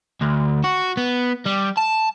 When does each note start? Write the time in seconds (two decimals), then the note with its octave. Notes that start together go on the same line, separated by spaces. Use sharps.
0.21 D2
0.64 F#4
0.97 B3
1.46 G3
1.77 A5